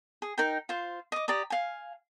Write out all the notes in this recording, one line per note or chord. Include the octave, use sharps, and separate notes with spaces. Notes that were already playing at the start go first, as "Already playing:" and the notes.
G#4
D#4 A#4 G5
F4 C5
D#5 D6
G4 D5 A#5 D#6
F5 G#5